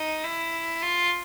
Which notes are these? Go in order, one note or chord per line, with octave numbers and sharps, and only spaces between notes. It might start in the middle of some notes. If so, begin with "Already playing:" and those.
Already playing: D#4
E4
F4